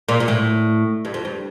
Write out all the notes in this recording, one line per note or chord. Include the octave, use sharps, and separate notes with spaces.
A#2
A#2
A2
G2
F2
G2